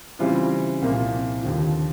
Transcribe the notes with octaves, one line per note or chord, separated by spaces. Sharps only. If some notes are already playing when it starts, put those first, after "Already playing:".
C#3 E3 G3 C4 F4
C2 A#2 F3 A#3
D#2 D3 F3